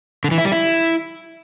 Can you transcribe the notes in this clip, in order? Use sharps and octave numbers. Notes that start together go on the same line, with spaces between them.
D3
E3
E4
G3
E4